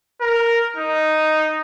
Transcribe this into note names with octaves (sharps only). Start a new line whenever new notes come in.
A#4
D#4